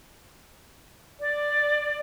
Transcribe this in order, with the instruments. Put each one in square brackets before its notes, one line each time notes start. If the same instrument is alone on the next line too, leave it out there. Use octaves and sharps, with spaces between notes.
[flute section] D5